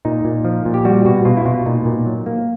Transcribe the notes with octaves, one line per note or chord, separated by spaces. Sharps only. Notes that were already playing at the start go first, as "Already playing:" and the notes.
A#2 D#4
A#2
F3
A#2
G4
G3 F#4
B2 F#4
B2 F4
E4
B2 F4
A#2 D#4
A#2
F#3
A#3